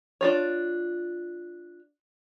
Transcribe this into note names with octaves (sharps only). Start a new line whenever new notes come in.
D4 F4 C#5